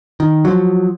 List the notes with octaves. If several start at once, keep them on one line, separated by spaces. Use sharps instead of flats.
D#3
F3 F#3